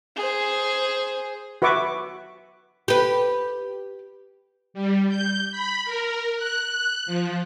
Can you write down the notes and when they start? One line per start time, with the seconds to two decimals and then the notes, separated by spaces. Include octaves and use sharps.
0.16 G#4 C5
1.62 F#4 B4 E5 C#6 D6
2.88 G4 B4
4.74 G3
5.09 G6
5.51 B5
5.85 A#4
6.37 F#6
7.06 F3